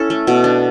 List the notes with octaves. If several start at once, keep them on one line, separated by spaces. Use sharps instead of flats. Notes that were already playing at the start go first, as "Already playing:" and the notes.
Already playing: C#4 E4 A4
A3
B2
D4